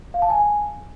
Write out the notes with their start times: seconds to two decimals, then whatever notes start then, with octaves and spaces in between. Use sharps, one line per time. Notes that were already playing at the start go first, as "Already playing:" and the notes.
0.14 F5
0.22 A5
0.30 G#5